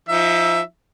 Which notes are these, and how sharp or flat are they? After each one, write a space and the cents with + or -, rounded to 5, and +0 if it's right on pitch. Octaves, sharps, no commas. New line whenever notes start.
F3 -5 D#4 +35 E5 +10